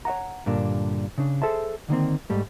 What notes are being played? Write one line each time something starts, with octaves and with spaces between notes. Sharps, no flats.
C#5 D#5 F#5 A#5
G2 A#2 D3 A#3 D4
C#3 D4
G#4 A4 C5 E5 A5
D3 D#3 A#3 C4
G#2 G3 A3